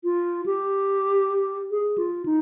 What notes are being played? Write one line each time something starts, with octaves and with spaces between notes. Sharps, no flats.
F4
G4
G#4
F4
D#4